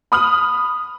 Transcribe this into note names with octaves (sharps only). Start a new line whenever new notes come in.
B5 D#6 F6 F#7